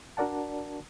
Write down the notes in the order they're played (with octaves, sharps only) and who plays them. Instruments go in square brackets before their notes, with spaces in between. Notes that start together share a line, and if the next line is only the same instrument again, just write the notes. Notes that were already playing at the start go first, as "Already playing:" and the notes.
[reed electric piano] D4 F#4 A#4 D5 F#5 A5